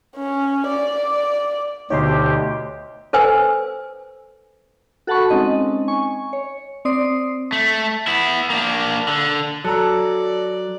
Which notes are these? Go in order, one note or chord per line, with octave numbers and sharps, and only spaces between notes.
C#4
D5
D2 B2 D3 D#4 G4 C#5 D#5 C6
A4 B4 C5 G#5 E6
F#4 A4 F#5 A5 B5 C#6
G#3 C4 C#4 D#4 D#5
G#5 C#6
C#5
C4 D5 D#6 C7
A3
B3 E4
A#3 D4
D3
F#3 A4 D5 A#5